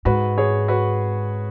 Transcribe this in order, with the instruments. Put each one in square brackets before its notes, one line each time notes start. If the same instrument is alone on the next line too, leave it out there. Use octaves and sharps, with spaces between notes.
[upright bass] G#2 [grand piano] F#4 B4
[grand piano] G#4 C#5
F#4 B4